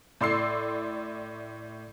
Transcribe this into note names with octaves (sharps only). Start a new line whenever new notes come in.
A2 D5 C6 E6 C7